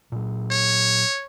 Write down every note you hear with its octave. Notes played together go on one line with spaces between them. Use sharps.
A#2 F#3
C#5